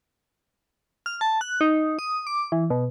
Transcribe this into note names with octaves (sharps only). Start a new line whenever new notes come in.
F6
A5
F#6
D#4
D#6
D6
E3
B2